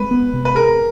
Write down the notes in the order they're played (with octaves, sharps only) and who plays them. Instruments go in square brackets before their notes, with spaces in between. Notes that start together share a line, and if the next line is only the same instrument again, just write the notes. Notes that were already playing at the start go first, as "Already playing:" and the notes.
Already playing: [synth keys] G#3 C4 [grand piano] B4
[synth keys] B3
C3
[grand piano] B4
[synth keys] G#4 [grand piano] A#4